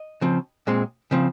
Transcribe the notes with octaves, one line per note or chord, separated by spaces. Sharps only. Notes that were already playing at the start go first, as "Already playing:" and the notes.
Already playing: D#5
C#3 F3 C4
A#2 G#3 C4
C#3 F3 C4